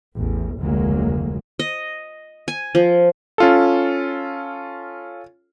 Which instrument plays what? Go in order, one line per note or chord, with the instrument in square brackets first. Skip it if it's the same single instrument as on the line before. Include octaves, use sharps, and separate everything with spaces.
[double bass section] A1 E2
F1 D2 F#3 G#3 A#3
[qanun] D#5
G#5
F3
[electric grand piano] C#4 F4 A4